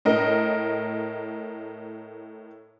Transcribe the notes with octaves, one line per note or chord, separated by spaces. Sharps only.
A2 A#4 D#5